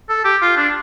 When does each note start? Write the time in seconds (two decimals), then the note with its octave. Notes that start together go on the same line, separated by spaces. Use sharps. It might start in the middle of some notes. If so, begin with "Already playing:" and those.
0.09 A4
0.25 G4
0.42 F4
0.57 D4